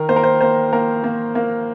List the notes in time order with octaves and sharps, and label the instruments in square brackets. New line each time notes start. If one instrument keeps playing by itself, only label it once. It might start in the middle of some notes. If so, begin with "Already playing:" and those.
Already playing: [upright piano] D#3 A#4
A#3 C5
A#4
C5
A#3 C5
A#3 A#4
A#3
A#3